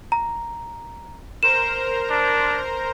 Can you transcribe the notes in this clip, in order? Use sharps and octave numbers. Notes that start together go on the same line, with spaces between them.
A#5
A#4 C5 A#5 E7
D4